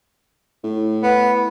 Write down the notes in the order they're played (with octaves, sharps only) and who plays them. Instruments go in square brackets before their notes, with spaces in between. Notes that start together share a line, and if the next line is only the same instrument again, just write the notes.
[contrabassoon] A2
[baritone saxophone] B3